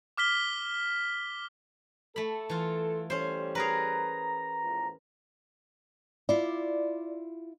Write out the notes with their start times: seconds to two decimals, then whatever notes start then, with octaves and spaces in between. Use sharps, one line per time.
0.17 D6 F6 B6 G7
2.16 A3 A4 B5
2.50 E3 F4
3.10 G3 C#4 G4 A4 C5
3.55 G#4 A#4 B4 A#5
4.63 E2 A2 F3
6.29 E4 F4 D5